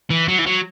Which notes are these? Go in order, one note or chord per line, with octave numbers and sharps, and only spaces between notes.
E3
F#3
E3
F#3